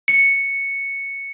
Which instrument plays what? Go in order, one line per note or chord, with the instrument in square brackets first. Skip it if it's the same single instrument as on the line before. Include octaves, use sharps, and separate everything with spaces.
[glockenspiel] C#7